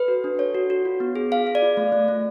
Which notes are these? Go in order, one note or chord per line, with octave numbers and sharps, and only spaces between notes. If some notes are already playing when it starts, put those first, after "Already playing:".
Already playing: A4 B4
F#4
D4
A4 C#5
F#4
F#4
F4
B3
G#4
G#4 F5
G#4
D5
F4
A3
A3
A3